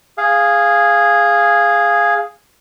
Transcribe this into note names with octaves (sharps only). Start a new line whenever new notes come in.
G#4 F5